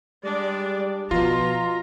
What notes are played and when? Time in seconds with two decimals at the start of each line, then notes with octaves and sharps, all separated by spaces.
0.24 G3 G#3 D4 D5
1.11 B2 F3 F4 A#5